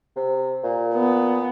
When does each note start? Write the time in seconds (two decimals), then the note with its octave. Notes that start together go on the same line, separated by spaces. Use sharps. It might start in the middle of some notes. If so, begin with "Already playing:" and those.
0.16 C3
0.64 A#2
0.95 B3